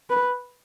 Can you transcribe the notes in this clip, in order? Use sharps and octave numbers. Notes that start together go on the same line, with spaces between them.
B4